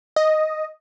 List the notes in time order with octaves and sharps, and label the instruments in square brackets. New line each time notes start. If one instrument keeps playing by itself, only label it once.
[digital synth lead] D#5